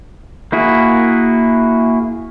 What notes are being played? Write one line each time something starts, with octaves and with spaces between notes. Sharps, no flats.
A#3 E4 F#4 G#4